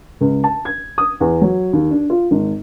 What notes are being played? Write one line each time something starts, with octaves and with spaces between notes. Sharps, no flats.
C#2
A5
G#6
D#6
E2
F#3
D#2
D4
F4
G#1